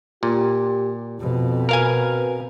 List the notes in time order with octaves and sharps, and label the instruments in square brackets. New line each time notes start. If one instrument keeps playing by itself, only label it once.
[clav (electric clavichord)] A#2 [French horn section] G4
[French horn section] F2 [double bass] B2
[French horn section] C4 F#4 B4 [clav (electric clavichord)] A#4 F5 G#5